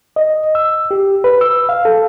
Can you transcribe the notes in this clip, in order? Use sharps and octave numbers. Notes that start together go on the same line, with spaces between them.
D#5
E6
G4
B4
E6
F5
A4